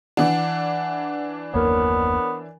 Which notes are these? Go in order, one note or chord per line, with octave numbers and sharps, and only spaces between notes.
E3 D4 F#5
F#1 D#2 A#3 B3 A#4 C#5